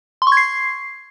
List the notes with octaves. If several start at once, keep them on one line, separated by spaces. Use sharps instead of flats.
C6
C#6
G#6
C7